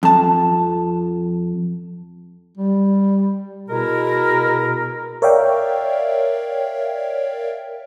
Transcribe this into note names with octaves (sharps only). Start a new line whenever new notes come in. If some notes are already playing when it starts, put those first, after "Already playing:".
F2 A5
G3
B2 G#3 E4 A#4
A#4 C#5 D5 E5 F5 G5